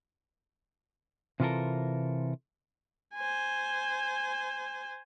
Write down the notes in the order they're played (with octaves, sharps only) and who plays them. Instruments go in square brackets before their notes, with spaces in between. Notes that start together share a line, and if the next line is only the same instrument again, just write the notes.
[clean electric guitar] C3 E3 F4 F#4 A4 A#4
[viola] C5 G#5